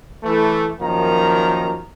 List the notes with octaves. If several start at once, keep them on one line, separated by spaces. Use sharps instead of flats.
E3 A3
F#2 D#3 F3 A#3 A#5